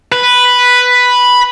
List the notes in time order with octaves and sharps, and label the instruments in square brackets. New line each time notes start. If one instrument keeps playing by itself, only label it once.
[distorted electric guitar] B4